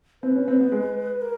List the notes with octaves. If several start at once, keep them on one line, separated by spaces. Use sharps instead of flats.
C4 B4
C#4
C4
B3
G#3
A#4